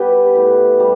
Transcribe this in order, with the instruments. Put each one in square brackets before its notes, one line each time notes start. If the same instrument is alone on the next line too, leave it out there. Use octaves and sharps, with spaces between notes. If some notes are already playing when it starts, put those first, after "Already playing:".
Already playing: [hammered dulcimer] G3 B3 G4 B4
A2
G3